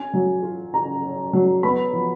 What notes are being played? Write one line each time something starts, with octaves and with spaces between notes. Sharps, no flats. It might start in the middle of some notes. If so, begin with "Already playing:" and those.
Already playing: C#4 G#5
F#3
F4
C#3 A#5
C#4
F#3
B3 B5
F3